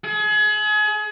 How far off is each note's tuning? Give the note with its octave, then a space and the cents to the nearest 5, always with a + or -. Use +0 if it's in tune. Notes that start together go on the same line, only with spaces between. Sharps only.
G#4 +35